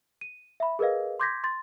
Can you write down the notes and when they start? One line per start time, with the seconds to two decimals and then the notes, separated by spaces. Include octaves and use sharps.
0.21 D#7
0.60 E5 B5
0.79 G#4 A#4 B4 D#5 F5
1.20 C6 D6 G6 G#6 A#6 B6
1.44 C6 A6